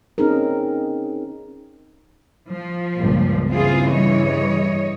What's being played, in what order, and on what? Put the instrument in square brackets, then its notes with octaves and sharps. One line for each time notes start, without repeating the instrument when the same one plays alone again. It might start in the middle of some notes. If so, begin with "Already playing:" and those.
[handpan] C4 C#4 D#4 G#4 A#4
[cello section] F3
[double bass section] C#2 G2 A#2
[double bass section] G2 C#3 E3 [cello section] C4 F4 G#4
[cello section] G3 C#5 D#5